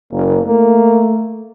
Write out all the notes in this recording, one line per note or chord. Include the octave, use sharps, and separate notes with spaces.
F#1 A#3
A3 A#3